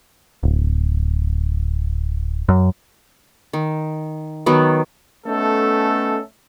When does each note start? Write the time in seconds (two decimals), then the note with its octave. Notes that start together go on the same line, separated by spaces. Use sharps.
0.43 D1
2.49 F#2
3.53 D#3
4.46 D#3 F#3 B3
5.26 A3 B3 C#4 D#4 A4